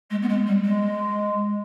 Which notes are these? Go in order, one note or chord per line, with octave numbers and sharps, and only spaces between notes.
G#3
B3
G#3
G3
G#3